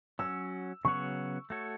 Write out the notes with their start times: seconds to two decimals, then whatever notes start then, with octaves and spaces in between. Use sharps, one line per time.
0.19 F#3 C#4 F#4 E6
0.85 C#3 F#3 B3 F#4 C#5 C#6
1.50 A3 F#4 A4 C#5